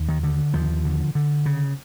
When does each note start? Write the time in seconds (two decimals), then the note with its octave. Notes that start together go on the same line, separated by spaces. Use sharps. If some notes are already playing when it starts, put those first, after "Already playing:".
Already playing: D#2
0.09 D#3
0.23 D3
0.54 D#2 F3
0.85 D3
1.15 D3
1.46 C#3